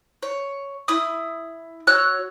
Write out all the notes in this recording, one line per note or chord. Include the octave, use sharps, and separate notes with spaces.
C#5
E4 B5 D#6
F#4 C#5 E6 F#6